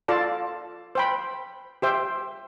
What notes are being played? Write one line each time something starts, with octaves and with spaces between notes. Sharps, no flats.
F4 A4 D5 A5
C5 G5 B5
G4 C5 E5 G5